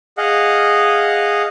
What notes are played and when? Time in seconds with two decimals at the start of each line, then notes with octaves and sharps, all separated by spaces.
0.18 G#4 D#5 F5 F#5